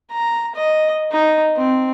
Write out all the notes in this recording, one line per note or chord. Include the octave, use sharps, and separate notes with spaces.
A#5
D#5
D#4
C4